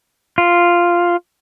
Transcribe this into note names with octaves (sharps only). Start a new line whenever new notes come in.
F4